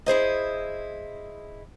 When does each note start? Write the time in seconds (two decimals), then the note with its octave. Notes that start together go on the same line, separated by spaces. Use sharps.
0.06 E4 G#4 C5 D#5